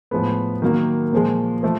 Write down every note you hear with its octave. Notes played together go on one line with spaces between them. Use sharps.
A2 F3 G#3 B3
D#3 F#3 A#3
A#2 F3 G#3
F3 A3